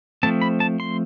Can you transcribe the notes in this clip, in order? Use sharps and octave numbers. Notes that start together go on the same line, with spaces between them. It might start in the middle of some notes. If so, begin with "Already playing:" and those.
F3 A3 C4 A5
B5
A5
C6